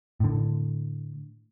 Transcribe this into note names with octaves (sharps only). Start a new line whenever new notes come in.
A2 D3